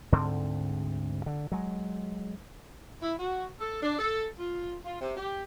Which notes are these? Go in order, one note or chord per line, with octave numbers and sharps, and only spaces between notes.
D2 G#2 D3 C4
D3
F#3 G#3
E4
F#4
A4
D4
A4
F4
F4
C3
G4